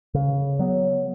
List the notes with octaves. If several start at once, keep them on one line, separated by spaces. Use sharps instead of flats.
C#3
F#3 B3